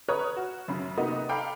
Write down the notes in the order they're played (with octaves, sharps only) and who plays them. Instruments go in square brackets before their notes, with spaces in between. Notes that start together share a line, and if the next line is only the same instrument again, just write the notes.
[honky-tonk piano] B4 C#5 A#5 D#6 F6 F#6
F#4
F#2 C#3
C3 A#3 B3 D#4 F#4
A4 F5 G5 A#5 B5 D6